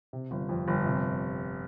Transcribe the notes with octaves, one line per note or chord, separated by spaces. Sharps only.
C3
G1
F2
G1
C3